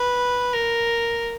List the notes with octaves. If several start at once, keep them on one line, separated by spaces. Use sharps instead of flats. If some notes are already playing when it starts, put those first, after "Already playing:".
Already playing: B4
A#4